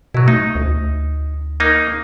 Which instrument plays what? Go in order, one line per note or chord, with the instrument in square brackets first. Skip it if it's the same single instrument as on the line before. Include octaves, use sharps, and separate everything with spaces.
[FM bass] B2 [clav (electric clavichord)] F#3 E4
[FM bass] A3 [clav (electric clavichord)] D#4
[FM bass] D2
[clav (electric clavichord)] A#3 D#4